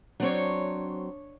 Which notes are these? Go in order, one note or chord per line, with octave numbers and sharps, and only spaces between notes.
F#3 C4 D4 C#5